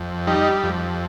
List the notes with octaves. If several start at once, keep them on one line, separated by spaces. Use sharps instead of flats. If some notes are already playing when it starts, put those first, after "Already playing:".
Already playing: F2
G3 D#4
F2